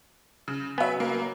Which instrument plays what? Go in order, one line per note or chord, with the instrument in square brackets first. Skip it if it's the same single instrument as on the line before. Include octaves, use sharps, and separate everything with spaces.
[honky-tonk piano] C#3
[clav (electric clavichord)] F#3 B3 [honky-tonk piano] E5 G#5
[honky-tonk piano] A#3